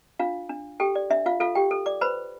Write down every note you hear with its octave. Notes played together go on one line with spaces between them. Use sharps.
D4 F4 F5
D4
G4 A4 G5
D5
D4 E5
F4 F5
F4 A4 F5
G4 G5
A4
D5 D6
B4 C5 B5